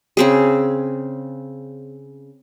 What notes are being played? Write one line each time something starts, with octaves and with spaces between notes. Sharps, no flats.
C#3 C4 G#4